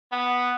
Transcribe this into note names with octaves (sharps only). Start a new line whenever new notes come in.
B3